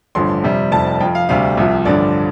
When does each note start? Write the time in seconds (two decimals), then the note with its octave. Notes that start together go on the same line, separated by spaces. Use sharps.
0.15 A1 G2 D3 F3 C6
0.43 F2 C3 G3
0.72 F1 F2 C3 G3 A5
1.01 F2 F3 G5
1.15 F5
1.29 D2 C3 G3 F5
1.57 C2 C3 F3
1.85 A1 G2 D3 F3 D5